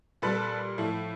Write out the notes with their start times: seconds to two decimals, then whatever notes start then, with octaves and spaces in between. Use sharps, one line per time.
0.22 A#2 G3 A4 B4
0.78 A2 F3 A3